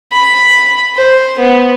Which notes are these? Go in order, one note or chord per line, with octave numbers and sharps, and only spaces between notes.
B5
C5
B3